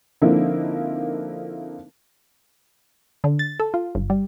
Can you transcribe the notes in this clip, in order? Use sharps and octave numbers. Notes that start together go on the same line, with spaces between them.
D3 F3 A#3 C4 D#4 E4
D3
A6
A4
F4
G1
G3